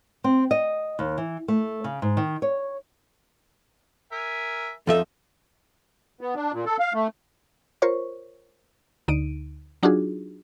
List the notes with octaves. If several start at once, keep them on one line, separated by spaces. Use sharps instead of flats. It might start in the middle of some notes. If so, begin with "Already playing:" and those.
C4
D#5
D#2
E3
A3
C#3
G#2
D#3
C#5
A#4 E5 G#5
F2 F3 D#4 A4 E5
B3
D4
A#2
A4
F5
A3
F4 A#4 C5 C#5 C#6
D2 D3 D#4 D7 D#7
F#3 D4 D#4 F4 F#4 G#4